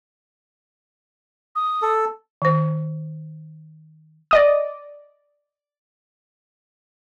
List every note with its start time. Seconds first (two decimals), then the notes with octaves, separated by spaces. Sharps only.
1.55 D#6
1.82 A4
2.42 D#3 C5
4.31 D5 D#5 D#6